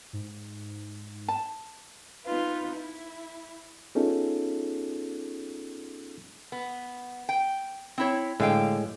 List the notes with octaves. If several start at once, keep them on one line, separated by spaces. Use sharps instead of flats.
G#2
A5
B3 D#4 F4 B4
E4
B3 C#4 D#4 F4 G#4 A4
B3
G5
C4 E4 C#5
A2 D3 G#3 F5 G5